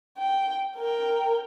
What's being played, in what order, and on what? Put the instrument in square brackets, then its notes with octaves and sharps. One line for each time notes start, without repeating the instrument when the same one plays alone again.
[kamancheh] G5
A#4 G5